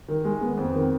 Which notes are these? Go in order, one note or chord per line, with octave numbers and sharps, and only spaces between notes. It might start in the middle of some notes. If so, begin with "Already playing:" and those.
D#3
G#3
B3
F2
D#3